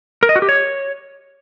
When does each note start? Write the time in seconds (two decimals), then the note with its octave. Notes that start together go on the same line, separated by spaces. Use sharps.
0.23 A#4
0.29 D#5
0.36 F#4
0.42 G4
0.49 C#5